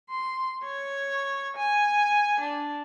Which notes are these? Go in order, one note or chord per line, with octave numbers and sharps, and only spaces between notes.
C6
C#5
G#5
D4